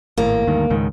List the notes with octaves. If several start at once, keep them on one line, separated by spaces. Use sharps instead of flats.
G#1 A2 A#3
D2 G2 D#3
C#2 G#2 D#3